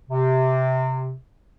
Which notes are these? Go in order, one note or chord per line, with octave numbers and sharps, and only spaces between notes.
C3